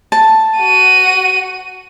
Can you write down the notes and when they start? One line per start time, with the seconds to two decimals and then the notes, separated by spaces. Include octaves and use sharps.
0.12 A5
0.57 F#4 D#7